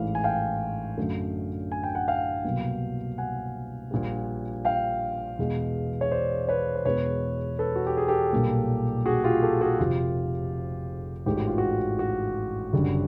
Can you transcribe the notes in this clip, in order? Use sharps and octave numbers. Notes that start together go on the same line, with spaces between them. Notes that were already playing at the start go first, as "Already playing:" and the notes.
Already playing: A1 G#2 E3 A3 F5
G#5
F5 G5
F#2 D3 F#3 A3
G#5
G5
F#5
F5 G5
C2 B2 F#3 A#3
F#5 G#5
A#1 A#2 G3
F5 G5
E2 B2 G#3
C#5
C5 D5
B4 C#5
C5
E2 B2 G#3 B4 C#5
A4 B4
F#4
G4
G#4
G4 A4
B1 A#2 G3 A#3
F#4 G#4
F4 G4
G4 A4
F#4 G#4
F1 F2 C3 F4 G4
A1 G#2 E3 A3 G4
F#4
F4
F#4
F#4
F#1 F#2 D3 G3